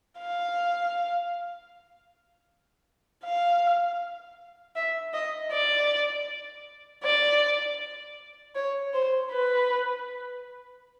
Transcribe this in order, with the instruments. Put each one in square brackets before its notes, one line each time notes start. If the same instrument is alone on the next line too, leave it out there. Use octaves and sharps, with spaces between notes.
[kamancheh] F5
F5
E5
D#5
D5
D5
C#5
C5
B4